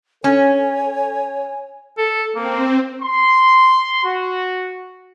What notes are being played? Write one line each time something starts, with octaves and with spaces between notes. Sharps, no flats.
C#4 A4 C#5 G#5
A4
A#3 C4
C6
F#4